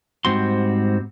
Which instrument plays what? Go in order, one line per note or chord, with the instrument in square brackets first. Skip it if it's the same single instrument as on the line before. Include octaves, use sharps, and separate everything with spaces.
[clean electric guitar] G#2 G3 C4 F#4 C6